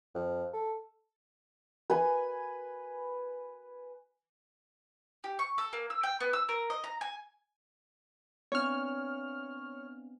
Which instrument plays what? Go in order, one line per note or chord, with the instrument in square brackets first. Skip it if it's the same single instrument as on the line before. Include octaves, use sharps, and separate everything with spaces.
[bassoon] F2
A4
[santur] B4 G#5
[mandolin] G4
C#6
A4
A#3
E6
G5
B3
E6
A#4
D#5
A#5
G#5
[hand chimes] B3 C4 D4 [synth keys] C#5 F6